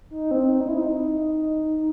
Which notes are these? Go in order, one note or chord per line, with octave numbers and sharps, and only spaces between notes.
D#4
C4
D#4
E4
D#4